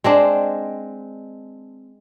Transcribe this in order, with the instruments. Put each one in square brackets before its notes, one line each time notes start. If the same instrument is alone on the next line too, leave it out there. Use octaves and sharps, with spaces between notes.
[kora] G#3 C4 D4